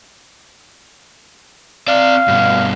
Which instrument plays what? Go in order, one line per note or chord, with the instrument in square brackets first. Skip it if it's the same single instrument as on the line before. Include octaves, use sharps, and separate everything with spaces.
[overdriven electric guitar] C4 D5 [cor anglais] F5
[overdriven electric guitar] G2 B2